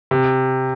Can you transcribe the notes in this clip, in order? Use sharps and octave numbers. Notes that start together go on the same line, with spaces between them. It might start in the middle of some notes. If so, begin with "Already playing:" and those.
C3